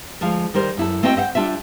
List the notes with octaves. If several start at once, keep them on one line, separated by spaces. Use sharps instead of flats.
D2 F3 G#3 F5
D#3 G3 A#4 C5
F#2 E4 A4
A3 C4 F#4 D#5 F5 G5
C5 D#5 E5 F#5 G5
G3 D4 F4 E5